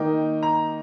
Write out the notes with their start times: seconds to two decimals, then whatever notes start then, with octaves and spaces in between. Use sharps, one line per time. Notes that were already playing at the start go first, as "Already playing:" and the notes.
Already playing: D#3 A#3 D#4 G5
0.43 A#5